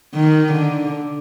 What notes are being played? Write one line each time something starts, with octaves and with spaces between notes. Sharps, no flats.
D#3
D3